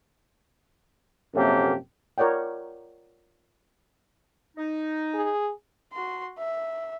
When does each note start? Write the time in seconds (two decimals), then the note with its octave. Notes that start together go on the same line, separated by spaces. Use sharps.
1.35 A#1 F#2 C3 A#3 G4 A4
2.18 F4 A#4 C#5 D5 F#5 G5
4.57 D#4
5.14 G#4
5.93 F#4 C6
6.38 E5